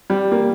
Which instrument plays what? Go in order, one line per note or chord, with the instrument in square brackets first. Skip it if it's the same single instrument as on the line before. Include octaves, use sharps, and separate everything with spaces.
[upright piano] G3
A#3